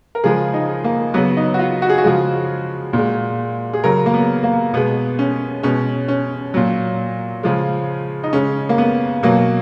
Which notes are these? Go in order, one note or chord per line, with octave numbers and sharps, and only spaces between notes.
A#4
C#3 F3 G#3 G#4
D#4
A#3
C#3 F#3 B3
D#4
F#4
F4
F#4
G#4
F#4
C#3 F3 G#3
A#2 G#3
G#4
C#3 F#3 A#4
A#3
B3
A#3
B2 G#3 B3
C#4
B2 G#3 C#4
C#4
A#2 F#3
C#3 F3 G#3
D#4
C#3 G#3 C#4
A#3
B3
B2 F#3 A#3